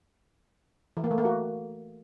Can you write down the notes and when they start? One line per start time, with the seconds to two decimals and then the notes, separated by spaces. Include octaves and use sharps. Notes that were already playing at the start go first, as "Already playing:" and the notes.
0.97 E3
1.04 A#3
1.11 A3
1.18 A#3
1.25 F#4